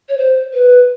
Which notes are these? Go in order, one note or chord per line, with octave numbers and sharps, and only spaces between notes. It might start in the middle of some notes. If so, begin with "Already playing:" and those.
C#5
C5
B4